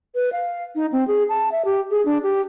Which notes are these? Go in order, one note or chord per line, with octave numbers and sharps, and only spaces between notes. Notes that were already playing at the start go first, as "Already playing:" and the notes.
B4
F5
D#4
C4
G#4
A5
E5
G4
G#4
D4
G4